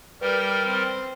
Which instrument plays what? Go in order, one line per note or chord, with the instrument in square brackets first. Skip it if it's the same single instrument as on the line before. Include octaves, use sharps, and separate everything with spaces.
[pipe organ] G3 A#4 [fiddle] G4 G5 [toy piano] B4
[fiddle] C4